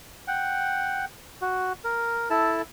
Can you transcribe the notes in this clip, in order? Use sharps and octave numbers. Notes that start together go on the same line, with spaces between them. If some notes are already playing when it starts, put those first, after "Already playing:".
F#5 G5
F#4
A#4
E4 A4 A5